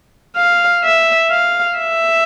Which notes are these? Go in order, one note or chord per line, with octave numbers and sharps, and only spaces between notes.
F5
E5
F5
E5